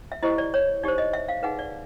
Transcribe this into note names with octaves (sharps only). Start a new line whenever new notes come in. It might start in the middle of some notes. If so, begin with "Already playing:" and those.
E5
E4 G4 C5 D#5
D5
C#5
D#4 G4 C5 D5
D#5
E5
F5
D#4 G#4 B4 F#5
D5